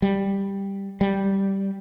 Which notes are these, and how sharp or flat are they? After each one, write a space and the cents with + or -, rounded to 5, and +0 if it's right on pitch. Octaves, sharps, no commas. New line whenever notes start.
G3 +5
G3 -5